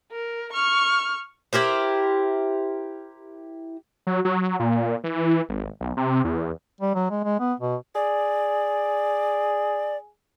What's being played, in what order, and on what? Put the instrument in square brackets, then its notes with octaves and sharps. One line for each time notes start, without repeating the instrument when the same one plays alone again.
[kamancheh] A#4
C#6 F6
[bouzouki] E4 G4 A#4 C5
[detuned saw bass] F#3
F#3
A#2
E3
G#1
B1
C3
E2
[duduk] G3
F#3
G#3
G#3
B3
B2
[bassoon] G#4 [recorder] D5